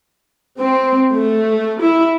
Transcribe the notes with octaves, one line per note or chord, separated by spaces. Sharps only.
C4
A3
E4